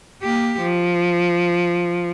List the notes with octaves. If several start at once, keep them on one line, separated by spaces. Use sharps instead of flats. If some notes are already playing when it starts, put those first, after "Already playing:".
A#3 G4
F3